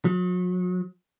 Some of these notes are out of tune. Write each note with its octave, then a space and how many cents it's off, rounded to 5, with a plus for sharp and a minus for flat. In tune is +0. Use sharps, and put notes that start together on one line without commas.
F#3 -40